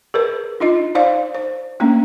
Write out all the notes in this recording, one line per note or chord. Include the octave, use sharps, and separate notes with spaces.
G#4 A#4 B4
D4 D#4 F4 D#5
D#4 C5 D5 F5
C5
A3 A#3 C#4 D4